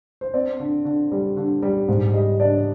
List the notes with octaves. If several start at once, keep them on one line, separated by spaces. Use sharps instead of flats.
C5
C4 D5
D3
D3
G3
D3
G3
G#2
G3 D#5
D4 D5